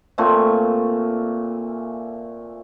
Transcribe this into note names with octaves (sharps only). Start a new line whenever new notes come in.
A#2 A3 C4 G#5